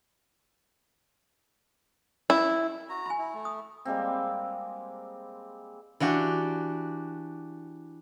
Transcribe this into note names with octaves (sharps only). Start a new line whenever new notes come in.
E4
F#4 A#5
G#5 B5
E4
A3
D#6
G3 G#3 A#3 C4
E3 D4 F#4 G4